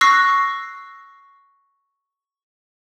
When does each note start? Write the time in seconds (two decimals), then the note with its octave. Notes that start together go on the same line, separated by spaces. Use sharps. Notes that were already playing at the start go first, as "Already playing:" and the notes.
0.01 C#6 E6 F#6 A#6 C7